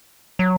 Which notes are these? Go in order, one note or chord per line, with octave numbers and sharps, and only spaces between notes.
F#3